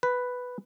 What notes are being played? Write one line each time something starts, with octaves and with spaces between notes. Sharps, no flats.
B4